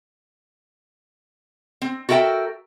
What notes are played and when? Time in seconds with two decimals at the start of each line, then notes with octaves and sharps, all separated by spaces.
1.82 C4
2.09 F#4 A4 A#4 E5 G5